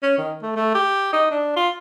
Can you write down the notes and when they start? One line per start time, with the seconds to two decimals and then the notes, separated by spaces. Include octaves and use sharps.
0.03 C#4
0.18 D#3
0.42 A3
0.56 A3
0.75 G4
1.13 D#4
1.31 D4
1.56 F4